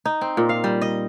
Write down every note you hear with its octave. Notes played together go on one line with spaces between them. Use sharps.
D#4
C4
A#2
F5
G3
D#5